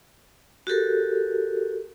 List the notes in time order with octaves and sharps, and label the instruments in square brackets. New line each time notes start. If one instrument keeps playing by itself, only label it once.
[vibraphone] F#4 G4 A4 A#4